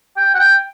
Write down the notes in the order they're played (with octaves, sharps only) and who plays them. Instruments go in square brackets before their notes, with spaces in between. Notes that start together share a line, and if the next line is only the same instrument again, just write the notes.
[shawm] G5
F#5
G5